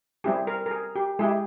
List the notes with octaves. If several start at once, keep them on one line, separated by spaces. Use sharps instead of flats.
G3 C4 E4 G4 G#4
A#4
A#4
G#4
G4
G#3 E4 G4 G#4